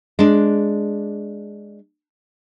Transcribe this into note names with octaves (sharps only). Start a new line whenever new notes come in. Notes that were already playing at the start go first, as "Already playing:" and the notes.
G#3 D4